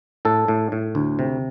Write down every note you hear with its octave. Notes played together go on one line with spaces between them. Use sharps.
A2 A4
A2
A2
D2
C3